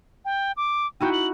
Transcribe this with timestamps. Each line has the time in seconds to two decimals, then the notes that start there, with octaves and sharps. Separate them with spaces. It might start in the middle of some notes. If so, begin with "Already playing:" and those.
0.25 G5
0.57 D6
1.01 D#4 E4 F#4 G5
1.13 F#7